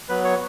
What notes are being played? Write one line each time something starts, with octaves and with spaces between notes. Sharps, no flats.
F#3 B3 B4
C#5